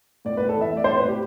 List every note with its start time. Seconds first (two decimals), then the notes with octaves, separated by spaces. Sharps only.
0.25 A2 D5
0.37 B4
0.41 A2
0.49 A4
0.56 E3 E5
0.72 A3 D5
0.84 C5
0.88 A2
0.97 B4
1.04 A2 G4